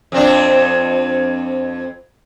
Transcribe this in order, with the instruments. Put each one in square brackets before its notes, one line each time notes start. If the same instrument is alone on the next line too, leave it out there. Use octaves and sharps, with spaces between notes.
[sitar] F2 C4 D4